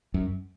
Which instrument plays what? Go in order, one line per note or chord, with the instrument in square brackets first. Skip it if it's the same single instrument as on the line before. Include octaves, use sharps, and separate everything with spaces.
[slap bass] F#2